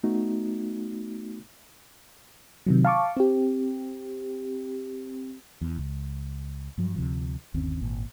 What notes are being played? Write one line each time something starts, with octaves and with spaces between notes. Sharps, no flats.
A3 B3 D#4 F#4
C3 D#3 F#3
F5 A5 C#6 D6
C4 G4
E2
C#2
G2 F3 F#3
D2 C3 F3
G1 D#2 C4 C#4
G#1 A#2